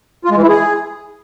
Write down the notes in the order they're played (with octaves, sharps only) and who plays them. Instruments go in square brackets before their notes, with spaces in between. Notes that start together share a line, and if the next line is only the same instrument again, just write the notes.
[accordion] F4
G#3
E3
E4
G#4